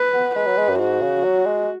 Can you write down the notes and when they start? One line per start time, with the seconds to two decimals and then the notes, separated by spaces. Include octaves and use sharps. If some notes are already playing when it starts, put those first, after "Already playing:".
Already playing: B4
0.13 B3
0.35 G#3 B4
0.47 F#3
0.57 G#3
0.69 F#2
0.80 G#2 F#4
1.02 C#3
1.24 F#3
1.46 G#3